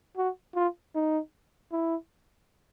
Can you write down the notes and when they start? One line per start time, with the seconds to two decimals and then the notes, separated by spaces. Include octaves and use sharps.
0.17 F#4
0.55 F4
0.95 D#4
1.72 E4